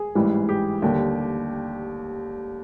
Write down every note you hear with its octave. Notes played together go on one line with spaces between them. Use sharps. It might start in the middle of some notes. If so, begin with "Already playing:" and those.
Already playing: G#4
A1 G#2 E3 G3
G4
D#2 D3 G3